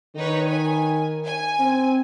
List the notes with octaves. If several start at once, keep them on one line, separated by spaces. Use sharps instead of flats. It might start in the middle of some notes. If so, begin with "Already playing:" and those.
D#3 D#4 B4 C#5
G#5
G#5
C4